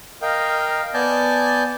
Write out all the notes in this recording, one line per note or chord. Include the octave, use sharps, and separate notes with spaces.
A#4 D#5 F5 G5
B3 D5 G#5 A5 G6